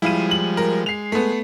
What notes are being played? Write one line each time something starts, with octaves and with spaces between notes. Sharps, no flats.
F3 G3 G#3 E4 F5 D#7
F#7
A#4
G#3 C7 F7
A3 B3